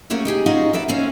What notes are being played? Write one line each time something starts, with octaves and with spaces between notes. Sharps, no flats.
A3 A#3 C#4 F4 F#4 G#4
D#4 G4 G#4 G#5
C#4 D#4 F4 F#4 G#4 D#5
A4 B4 D5 E5
A#3 C4 C#4 C5 C#5 G#5